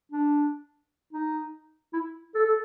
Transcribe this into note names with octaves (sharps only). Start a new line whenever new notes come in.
D4
D#4
E4
A4
A4